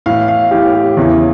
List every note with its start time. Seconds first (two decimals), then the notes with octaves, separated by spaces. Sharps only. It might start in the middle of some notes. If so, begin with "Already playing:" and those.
0.06 A2 E3 F5
0.28 F5
0.51 A2 E3 G4
0.75 G4
0.97 E2 C#3 E3